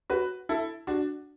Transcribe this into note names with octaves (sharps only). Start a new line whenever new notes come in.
F#4 B4
E4 A4
D4 F#4